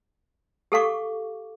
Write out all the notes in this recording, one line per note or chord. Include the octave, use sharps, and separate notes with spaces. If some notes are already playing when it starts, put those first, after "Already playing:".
G4 A4 F5 C#6 D6